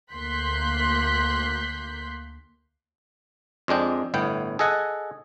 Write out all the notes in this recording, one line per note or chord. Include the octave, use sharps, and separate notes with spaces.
D2 A#3 C6 F#6 G6 B6
F2 G#3 D4 G5
G1 A2 B3 G5
G#4 A4 D#5 F#5 G#5